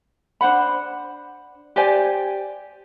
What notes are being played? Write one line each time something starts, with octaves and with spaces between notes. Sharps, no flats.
D4 C5 F#5 B5
G4 C5 D5 G#5